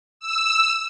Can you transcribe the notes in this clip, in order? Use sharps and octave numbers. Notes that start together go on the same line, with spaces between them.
E6